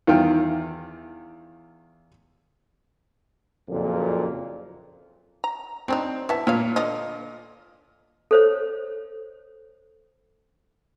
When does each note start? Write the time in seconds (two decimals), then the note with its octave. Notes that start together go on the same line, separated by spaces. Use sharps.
0.07 E2 D#3 F4 G5 F6
3.69 F#1 F2 A#2
5.44 A#5
5.88 F#3 C4 D4 D#4
6.29 E3 B3 E5 A5
6.47 A#2 F4 C#5 F5
6.76 D3 F4 D#5
8.31 A4 C5 C#5